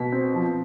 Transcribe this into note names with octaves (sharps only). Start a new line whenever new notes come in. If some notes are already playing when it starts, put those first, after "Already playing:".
Already playing: B2 B6
C4
F3